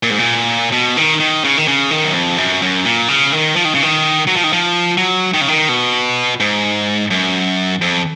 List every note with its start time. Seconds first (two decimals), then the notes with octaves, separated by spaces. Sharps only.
0.03 A#2
0.10 G#2
0.19 A#2
0.72 B2
0.97 D#3
1.20 D#3
1.44 C#3
1.58 D#3
1.68 C#3
1.91 D#3
2.04 F#2
2.14 F2
2.38 F#2
2.62 F#2
2.85 A#2
3.08 C#3
3.32 D#3
3.56 F3
3.65 D#3
3.74 C#3
3.82 D#3
4.27 F#3
4.36 F3
4.44 D#3
4.53 F3
4.97 F#3
5.34 D#3
5.41 C#3
5.48 D#3
5.69 B2
6.40 G#2
7.11 F#2
7.81 F2